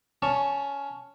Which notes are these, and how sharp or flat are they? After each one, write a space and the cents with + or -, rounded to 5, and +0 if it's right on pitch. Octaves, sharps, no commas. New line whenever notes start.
C#4 +10 A5 +0 C#6 +0